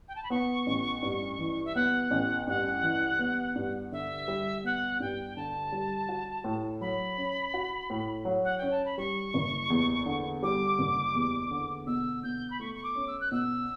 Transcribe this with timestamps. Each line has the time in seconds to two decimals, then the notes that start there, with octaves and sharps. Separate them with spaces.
0.08 G5
0.15 A5
0.23 B5
0.30 B3 C#6
0.67 A1
1.02 G2
1.39 E3
1.64 E5
1.75 B3 F#5
2.11 A1
2.47 G2 F#5
2.83 E3
3.19 B3
3.55 G2
3.92 D3 E5
4.28 G3
4.64 B3 F#5
5.00 G2 G5
5.36 D3 A5
5.72 G3
6.09 F#4
6.44 A2
6.81 F#3 B5
7.17 C#4
7.54 F#4
7.90 A2
8.25 F#3
8.44 F#5
8.57 C#4 G5
8.71 A5
8.85 B5
8.97 G3 C#6
9.34 F#1
9.70 E2
10.06 D3
10.43 G3 D6
10.79 F#1
11.15 E2
11.51 D3
11.86 B2 E6
12.23 B2 G6
12.50 B5
12.60 A3 C#6
12.74 C#6
12.83 D6
12.96 C#4
13.07 E6
13.20 F#6
13.31 B2 E6